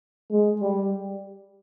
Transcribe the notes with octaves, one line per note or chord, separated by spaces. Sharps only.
G#3
G3